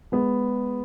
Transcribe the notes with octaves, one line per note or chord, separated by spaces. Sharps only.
G#3 B3